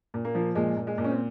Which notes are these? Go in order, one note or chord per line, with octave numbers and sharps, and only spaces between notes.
A#2
A#3
F3
A#2 G#3
A#2
G#3
A#2
C#4
C4